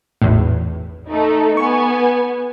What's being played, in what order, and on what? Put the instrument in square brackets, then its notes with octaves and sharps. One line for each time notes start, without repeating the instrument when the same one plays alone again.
[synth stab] G#1 E2 A2
[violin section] A3 D#4 A4
[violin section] B3 G#5 [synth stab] C#6